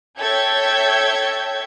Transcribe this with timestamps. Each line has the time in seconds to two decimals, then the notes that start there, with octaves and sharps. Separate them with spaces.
0.19 A4 C#5 E5 G5 G6 G#6